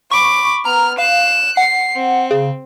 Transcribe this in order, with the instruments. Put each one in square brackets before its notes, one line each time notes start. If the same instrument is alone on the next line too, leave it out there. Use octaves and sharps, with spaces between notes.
[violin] B5 D6 [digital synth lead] C#6
[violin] B3 F6 [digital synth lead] A#5
[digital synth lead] F5 [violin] F#6 E7
[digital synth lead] F#5 [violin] C7
[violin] C4
[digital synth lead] C#3